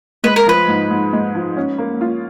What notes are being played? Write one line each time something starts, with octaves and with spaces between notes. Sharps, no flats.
G#3 B4
A#4
F3 B4
G#2
G#2
G#3
F3
C#4
A#3
F4